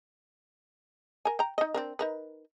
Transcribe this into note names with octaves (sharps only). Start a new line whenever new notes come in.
A#4 G#5
G5 A#5
D#4 D#5
C4 D4 A#4
D#4 A#4 B4